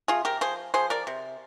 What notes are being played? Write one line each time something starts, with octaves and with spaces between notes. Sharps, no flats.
C3 F4 G#4
G4 A#4
F3 G#4 C5
F3 G#4 C5
A#4 D5
C3